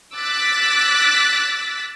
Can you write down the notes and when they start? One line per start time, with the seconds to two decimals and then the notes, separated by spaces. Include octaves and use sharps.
0.14 D6 E6 F#6 A6 B6